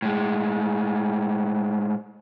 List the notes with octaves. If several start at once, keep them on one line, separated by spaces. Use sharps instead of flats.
A2 G#3